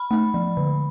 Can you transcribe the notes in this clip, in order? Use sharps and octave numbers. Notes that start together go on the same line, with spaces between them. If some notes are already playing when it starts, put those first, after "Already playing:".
Already playing: B5
A3
F3
D3